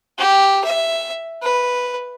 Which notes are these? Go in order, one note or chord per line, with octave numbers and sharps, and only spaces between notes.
G4
E5
B4